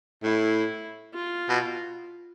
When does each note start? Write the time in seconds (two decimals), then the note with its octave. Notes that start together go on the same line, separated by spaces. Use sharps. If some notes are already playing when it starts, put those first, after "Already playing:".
0.23 A2 E4
1.14 F4
1.49 B2